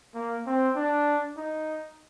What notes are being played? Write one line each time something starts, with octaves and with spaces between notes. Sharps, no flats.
A#3
C4
D4
D#4